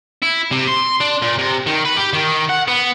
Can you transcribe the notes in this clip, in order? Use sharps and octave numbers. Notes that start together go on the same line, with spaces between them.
E4
C3
C6
D4
A#2
C3
D#3
B4
G4
D#3
F#5
B3